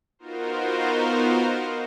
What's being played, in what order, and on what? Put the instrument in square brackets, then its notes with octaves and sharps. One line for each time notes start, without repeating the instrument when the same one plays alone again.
[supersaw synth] B3 D#4 F4 F#4 A#4 C5